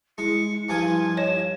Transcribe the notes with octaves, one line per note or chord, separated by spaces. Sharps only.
G#3 E4 C#7
G2 F3 E4 F4 G#5
C#5 D#5 E7